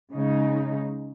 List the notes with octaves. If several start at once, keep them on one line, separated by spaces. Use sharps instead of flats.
C#3 G#3 D#4